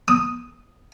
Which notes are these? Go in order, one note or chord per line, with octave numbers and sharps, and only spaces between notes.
D#6